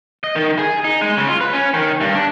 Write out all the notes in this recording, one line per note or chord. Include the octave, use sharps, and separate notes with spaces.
D#5
D#3
G#4
D#4
G#3
C#3
F4
B4
C#4
D#3
G2
D4